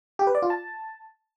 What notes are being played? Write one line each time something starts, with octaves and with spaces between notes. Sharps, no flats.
G4
B4
D5
F4
A5